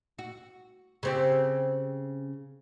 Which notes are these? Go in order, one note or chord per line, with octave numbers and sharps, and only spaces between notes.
F#4
C#3 C4 G4